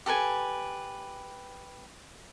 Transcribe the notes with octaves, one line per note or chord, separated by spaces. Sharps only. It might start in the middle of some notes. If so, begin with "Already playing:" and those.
G4 A4 B4 G#5